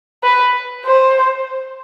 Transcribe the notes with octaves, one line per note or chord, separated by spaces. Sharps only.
B4
C5